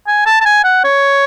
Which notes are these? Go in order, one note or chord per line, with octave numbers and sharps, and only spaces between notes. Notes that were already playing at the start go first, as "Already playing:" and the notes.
G#5
A5
A5
G#5
F#5
C#5